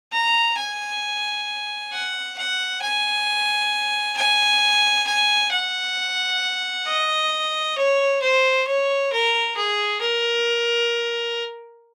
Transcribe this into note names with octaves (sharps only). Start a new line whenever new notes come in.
A#5
G#5
F#5
F#5
G#5
G#5
G#5
F#5
D#5
C#5
C5
C#5
A#4
G#4
A#4